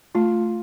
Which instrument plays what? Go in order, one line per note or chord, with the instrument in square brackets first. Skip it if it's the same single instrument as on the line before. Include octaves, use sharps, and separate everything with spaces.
[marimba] A3 [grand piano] F4